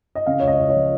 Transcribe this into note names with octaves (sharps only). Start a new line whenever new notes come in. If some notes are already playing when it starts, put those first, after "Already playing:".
D#5
C#3 F5
C#2 C#5
D#5
C#2
C#5
F3